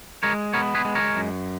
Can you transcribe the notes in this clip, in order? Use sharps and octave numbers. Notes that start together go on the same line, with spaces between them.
G#3 A#4 C#5
B3 A#4 C#5
G#4 B4
G#3
A#4 C#5
F#2